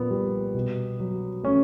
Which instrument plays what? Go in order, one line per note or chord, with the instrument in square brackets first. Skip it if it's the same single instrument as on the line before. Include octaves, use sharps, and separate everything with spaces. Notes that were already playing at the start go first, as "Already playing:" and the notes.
Already playing: [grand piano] A#2 B3
G3
B2
F#3
A3 C#4